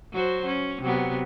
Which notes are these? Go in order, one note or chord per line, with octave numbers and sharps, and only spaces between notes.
F#3 F#4 C5
C#4
C3 F#3 B3